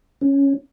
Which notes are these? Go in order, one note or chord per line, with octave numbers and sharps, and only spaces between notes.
C#4